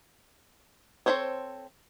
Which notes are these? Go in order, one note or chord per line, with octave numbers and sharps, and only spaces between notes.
C4 E4 A4 C5 C#5